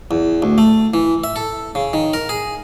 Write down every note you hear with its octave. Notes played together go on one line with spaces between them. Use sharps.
E2
D2
A3
E3
E5
A4
C#3
D#3
A#4
G#4